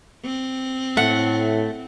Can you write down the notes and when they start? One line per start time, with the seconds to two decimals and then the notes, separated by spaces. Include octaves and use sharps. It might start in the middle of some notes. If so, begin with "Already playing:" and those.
0.25 C4
0.97 A2 A3 F#5